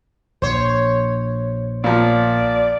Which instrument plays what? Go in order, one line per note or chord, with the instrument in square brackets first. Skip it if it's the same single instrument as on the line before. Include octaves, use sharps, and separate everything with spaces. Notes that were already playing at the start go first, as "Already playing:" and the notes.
[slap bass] A#1 [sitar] C5 C#5
[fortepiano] A#2 F3 [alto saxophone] D5